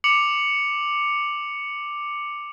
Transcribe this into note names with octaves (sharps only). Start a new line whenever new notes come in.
D6 C#7 F7 F#7